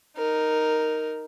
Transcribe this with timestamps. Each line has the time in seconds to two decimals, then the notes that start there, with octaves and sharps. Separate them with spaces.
0.17 D#4 A#4